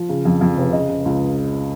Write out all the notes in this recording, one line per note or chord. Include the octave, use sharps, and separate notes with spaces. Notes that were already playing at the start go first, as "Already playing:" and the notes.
Already playing: F3
C#3
F2
F2
F1
C#3 D#5
C#3
C#2